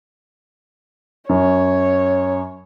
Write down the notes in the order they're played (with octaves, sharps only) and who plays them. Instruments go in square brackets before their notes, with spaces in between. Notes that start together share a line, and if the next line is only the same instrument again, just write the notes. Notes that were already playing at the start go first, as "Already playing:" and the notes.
[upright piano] F#2 [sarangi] C#5